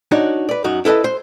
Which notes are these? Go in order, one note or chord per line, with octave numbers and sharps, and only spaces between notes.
D4 D#4 F#4 C#5
B4 D5
F#2 D#4 F#4
E4 A4 B4 D#5 A5
C5